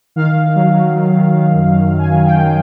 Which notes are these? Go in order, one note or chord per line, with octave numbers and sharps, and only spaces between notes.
D#3 F5
D#3
F#3
F#3
D#3
D#3
D#3
F#2
F#2
F#2
G#5
D#3
G5
D#3